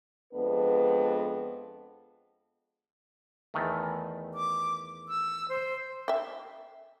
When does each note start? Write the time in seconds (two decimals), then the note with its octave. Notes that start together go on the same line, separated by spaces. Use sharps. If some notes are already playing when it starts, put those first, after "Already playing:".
0.33 F2 G#3 B3 D4 B4
3.54 E2 D#3 A3
4.34 D6
5.08 E6
5.49 C5
6.08 E5 G5